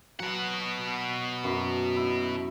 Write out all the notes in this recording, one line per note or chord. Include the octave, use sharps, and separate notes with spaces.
B2 F#3 F#5
F#2
E4